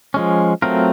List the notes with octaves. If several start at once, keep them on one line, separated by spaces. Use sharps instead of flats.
F3 G#3 C#4
F#3 A3 C4 F4 A#4